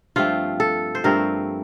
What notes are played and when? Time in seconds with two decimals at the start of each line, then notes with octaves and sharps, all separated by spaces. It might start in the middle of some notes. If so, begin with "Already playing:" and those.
0.16 G2 F3 A3 C4 F4
0.60 A4
0.95 C5
1.04 G2 F3 A3 C4 A#4